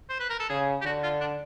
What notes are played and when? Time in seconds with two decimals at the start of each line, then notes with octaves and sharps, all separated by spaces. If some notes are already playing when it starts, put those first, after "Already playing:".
0.09 C5
0.20 B4
0.30 A#4
0.40 A4
0.50 C#3 G#4
0.81 G4
0.85 D3 F#4
1.03 F4
1.21 D4